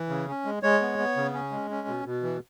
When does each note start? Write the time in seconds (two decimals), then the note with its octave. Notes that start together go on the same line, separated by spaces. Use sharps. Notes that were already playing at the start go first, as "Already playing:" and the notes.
Already playing: E3
0.09 C#3
0.28 C#4
0.45 G#3
0.63 G#3 C#5
0.81 B3
0.98 B3
1.16 C#3
1.34 C#4
1.51 G#3
1.70 C#4
1.88 B2
2.05 B2
2.23 E3